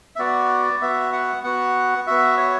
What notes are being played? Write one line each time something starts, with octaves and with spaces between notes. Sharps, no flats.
E5
B3 F#4 D5
B3 F#4 E5
F#5
B3 F#4 F#5
B3 F#4 E5
C#5